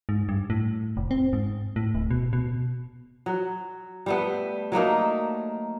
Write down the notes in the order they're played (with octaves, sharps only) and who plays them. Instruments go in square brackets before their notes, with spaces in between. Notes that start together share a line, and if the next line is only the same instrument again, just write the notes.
[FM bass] G#2
G2
A2
F1
C4
G#2
A2
D1
B2
B2
[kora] F#3
G3 A3 B3
F#3 A3 A#3 D#4